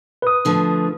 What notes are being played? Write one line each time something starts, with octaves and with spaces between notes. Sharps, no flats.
B4 D#6
D3 F3 A3